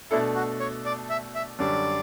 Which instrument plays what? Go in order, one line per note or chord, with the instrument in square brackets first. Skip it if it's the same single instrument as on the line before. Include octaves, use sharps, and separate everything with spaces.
[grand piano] B2 A3 D4 A4 [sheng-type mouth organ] E4
[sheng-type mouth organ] F#4
C#5
D5
E5
E5
[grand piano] F#2 D3 G3 [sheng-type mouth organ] D5